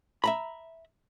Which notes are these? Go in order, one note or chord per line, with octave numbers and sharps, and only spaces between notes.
E5 A#5 B5